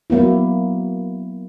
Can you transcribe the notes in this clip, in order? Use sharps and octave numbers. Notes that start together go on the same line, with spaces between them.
F#3 A#3 B3 E4